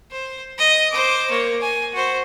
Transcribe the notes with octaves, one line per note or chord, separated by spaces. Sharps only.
C5
D#5
C5 D6
A#3 C#5
G#5
F#4 C5